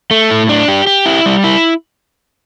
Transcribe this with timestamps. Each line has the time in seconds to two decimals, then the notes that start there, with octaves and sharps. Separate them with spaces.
0.11 A3
0.31 A2
0.49 D4
0.68 G4
0.87 G4
1.06 E4
1.26 G3
1.44 E4